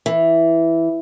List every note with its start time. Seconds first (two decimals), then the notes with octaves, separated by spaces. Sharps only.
0.06 E3